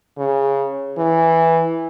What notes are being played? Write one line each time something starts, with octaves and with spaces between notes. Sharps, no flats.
C#3
E3